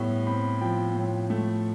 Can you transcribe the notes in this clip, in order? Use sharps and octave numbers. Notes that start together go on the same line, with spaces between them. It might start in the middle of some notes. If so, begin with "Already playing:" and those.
Already playing: A2 G3 B3 E4
C4 B5
F3 G5
A2
A3